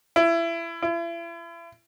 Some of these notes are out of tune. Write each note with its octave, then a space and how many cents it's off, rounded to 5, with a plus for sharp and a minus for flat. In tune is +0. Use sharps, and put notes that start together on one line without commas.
E4 +25
E4 +40